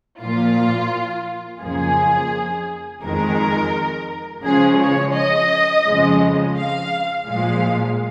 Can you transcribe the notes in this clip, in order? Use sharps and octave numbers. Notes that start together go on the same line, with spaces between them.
A#2 F3 A#3 F4
F2 C#3 F3 A#3 G#4
F2 D#3 G#3 A#4
C#3 F3 G#3 G#4
C#5
D#5
F2 C#3 F3 G#3
F5
A#2 F3 G#3 F5